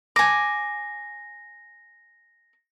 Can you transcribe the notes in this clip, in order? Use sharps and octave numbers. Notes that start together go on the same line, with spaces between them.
G#5 D6 A#6